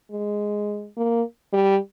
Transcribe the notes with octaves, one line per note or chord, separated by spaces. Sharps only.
G#3
A#3
G3